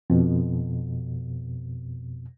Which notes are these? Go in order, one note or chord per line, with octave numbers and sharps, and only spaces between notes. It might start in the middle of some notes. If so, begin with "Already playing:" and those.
F2 B2